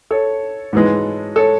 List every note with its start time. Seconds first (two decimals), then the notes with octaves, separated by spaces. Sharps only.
0.11 A4 C#5
0.73 G#2 E3 G#3
1.36 A4 C#5